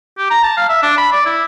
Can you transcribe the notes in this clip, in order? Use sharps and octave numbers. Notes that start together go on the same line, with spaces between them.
G4
A#5
A5
F5
E5
D4
B5
D5
E4